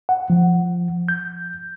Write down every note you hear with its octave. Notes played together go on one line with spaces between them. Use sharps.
F#5
F3
G6